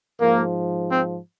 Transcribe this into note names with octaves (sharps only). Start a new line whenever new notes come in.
G#2 F3 A#3
C4